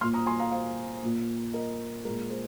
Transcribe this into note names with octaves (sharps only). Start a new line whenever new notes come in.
A#2 A#3 C6 F6
A#5 D#6
G#5 C6
F5 A#5
C5 F5
A#2 A#3
A#4 D#5
A#2 G#3 A#4
G#4 C5